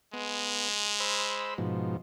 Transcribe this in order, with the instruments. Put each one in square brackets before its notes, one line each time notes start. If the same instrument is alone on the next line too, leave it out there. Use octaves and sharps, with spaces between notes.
[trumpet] G#3 [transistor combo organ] B3
[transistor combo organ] C5 B5 E6
G#2 B2 F3